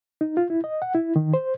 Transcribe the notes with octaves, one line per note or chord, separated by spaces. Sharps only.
D#4
F4
E4
D#5
F#5
E4
D#3
C5